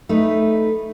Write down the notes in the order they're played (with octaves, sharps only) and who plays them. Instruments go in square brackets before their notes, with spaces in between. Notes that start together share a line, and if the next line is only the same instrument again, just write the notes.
[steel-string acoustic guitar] A3 D#4 B4